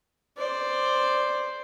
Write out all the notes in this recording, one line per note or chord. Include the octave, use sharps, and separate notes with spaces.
C5 D5